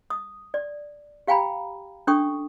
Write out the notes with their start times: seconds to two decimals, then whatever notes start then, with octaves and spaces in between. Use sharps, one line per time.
0.10 D#6
0.54 D5
1.27 G4 F5 G5 G#5 A#5 B5
2.07 C#4 D4 A4 G5 C#6 D#6